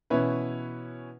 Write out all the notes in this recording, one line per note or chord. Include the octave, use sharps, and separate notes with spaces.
B2 E3 C#4 E4 B4